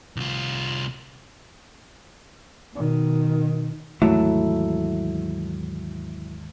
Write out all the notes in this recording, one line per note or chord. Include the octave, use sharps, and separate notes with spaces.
C2 F4
B2 D#3
D#2 G#2 E3 F#3 A3 E4